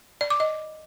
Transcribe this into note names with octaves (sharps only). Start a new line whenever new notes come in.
D5
D6
D#5